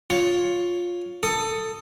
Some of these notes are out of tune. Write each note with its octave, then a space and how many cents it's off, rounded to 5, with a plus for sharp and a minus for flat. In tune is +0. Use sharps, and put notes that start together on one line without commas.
F4 +10 C#5 +0
A4 +15 D#6 +0